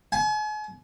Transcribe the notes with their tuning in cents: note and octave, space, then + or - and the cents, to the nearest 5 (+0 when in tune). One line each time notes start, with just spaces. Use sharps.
G#5 +40